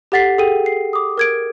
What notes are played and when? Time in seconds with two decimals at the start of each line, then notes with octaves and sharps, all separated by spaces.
0.12 G4 A4 F#5 A6 B6 C7
0.38 G#4 A4 G5 D#7
0.66 C7
0.93 D6 D#6
1.18 A#4 G#6 D7